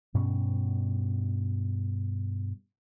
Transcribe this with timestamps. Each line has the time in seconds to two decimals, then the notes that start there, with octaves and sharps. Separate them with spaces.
0.14 G2 B2 G3 C#4